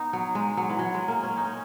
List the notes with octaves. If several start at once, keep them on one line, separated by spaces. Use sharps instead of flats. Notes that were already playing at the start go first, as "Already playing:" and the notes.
Already playing: B3 D#4
F#3
G#3
F#3
E3
F#3
G#3
A#3
C#4
D#4
C#4